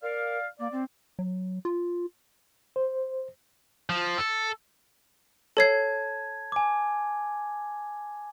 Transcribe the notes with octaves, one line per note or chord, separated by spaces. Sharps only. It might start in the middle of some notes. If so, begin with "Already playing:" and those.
A#4 D5 F5
A#3 D5
C4
F#3
F4
C5
F3
A4
A4 C#5 A5 G#6 C7
G#5 D6